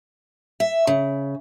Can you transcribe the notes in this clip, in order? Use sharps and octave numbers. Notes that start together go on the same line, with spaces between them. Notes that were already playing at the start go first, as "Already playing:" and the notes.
E5
C#3